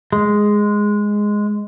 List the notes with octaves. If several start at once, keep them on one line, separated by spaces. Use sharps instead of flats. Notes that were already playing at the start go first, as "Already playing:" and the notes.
G#3